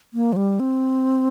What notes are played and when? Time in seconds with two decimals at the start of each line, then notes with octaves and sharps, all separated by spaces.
0.14 A#3
0.33 F3
0.36 G3
0.60 C4